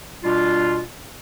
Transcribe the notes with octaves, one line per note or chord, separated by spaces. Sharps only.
B2 G3 D4 F4